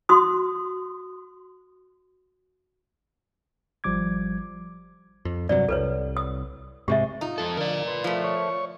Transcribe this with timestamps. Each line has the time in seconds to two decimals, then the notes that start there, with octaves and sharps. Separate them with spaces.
0.09 F#4 C6 D#6
3.84 G#1 F3 G3 D6 G#6
5.25 F2
5.49 G2 C3 F#3 D5
5.69 C2 A4 B4 C#5
6.17 D#6
6.88 G#2 C3 G#3 G4 E5
7.21 D#4 F4
7.38 F2 A4
7.57 D3 F3 A#4 D5
7.88 B4 C6
8.04 F3 A3
8.24 C#5 C#6